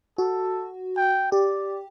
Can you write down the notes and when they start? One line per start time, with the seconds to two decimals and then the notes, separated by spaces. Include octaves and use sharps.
0.18 F#4 A4
0.97 G5
1.32 G4 D5